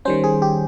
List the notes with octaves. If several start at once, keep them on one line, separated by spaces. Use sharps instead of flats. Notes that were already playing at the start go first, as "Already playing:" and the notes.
D#3 G3 C#4 C5
G#4
G4